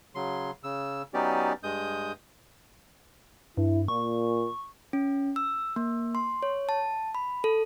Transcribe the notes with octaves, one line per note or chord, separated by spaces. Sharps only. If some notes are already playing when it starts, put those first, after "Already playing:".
C#3 F#3 C6
C#3 E6
F#3 B3 C#4 D#4 G4 D5
G2 G#3 D#6 G6
G2 E4
A#2 C#6
C#4
E6
A#3
C6
C#5
A5
B5
A4